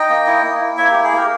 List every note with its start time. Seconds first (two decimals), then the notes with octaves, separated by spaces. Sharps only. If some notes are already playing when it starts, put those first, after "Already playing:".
Already playing: D#4 D#5 G5
0.10 A#3
0.26 E4
0.43 A#3
0.61 E4
0.77 A#3 C#5 E5
0.91 E4 G4
1.04 G#4
1.13 A#3 G4 A#4